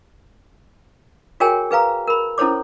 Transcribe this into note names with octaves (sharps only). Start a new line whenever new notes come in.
F#4 G#4 A#4 C#5 G5 G#5
G#4 B4 F5 A#5
A#4 B5
C#4 E4 A4 C5 C#5 D6